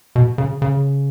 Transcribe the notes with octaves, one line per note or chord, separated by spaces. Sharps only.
B2
C#3
C#3